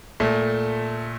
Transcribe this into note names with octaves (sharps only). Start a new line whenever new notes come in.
A#2 A3